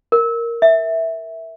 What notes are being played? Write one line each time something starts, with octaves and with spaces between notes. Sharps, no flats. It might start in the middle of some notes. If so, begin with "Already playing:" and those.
A#4
E5